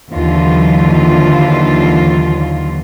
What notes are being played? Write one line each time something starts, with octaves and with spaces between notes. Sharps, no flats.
D#2 D3 E3 F#3 F4